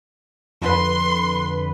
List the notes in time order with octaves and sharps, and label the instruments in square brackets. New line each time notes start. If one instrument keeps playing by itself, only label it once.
[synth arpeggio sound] F2 D3 B4 [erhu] C6